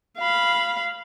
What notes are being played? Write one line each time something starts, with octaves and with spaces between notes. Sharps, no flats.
F5 B5